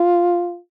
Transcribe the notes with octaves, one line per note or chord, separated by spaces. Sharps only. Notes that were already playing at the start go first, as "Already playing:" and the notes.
Already playing: F4